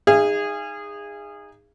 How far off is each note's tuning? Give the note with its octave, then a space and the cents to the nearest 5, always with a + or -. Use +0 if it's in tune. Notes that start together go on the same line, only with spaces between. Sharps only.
D#4 +0 G#4 -20 F5 -40